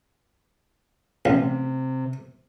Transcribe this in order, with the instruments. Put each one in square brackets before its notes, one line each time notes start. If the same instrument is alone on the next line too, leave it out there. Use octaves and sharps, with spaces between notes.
[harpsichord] A1 [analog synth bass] C3